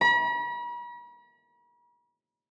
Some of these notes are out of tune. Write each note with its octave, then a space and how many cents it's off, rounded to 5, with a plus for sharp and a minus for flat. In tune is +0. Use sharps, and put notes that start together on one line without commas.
B5 -45